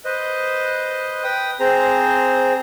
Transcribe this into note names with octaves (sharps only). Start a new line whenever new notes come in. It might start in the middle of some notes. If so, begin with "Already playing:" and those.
B4 C5 D#5
B4 G5 D#6
C4 G#4 C5 A#5